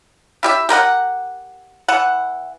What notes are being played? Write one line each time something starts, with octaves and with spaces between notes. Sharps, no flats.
E4 G4 E5
G4 A#4 B4 F#5
E3 F#5